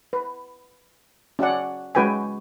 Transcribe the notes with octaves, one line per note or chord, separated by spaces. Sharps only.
B4
C#4 F#4 D5 F#5
G#3 C#4 F#4 B4 G5 G#5